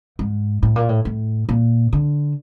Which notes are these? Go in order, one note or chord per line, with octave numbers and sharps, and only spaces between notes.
G#2
A2
A#2
A2
A2
A#2
D3